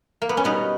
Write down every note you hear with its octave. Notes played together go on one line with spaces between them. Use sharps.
A#3
B3
C#4
B2 G3 B3 D#4